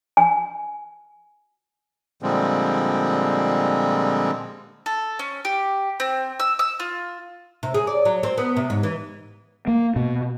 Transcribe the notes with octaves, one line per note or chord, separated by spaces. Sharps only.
G#5
A#2 D3 F3 G3 G#3 C4
A4
C#4
G4
C4
E6
E6
F4
C3
G#4
D5
F#3
C4
B3
C3
G#2
E3
A#3
B2